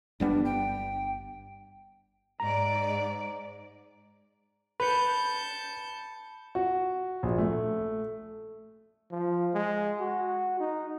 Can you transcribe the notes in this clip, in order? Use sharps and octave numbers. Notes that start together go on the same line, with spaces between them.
G1 G3 B3 D4
G5
G#2 D5 A#5
B4 A5 B5 G6 C#7
F#4
A#1
A3
F3
G#3
F#4
D#4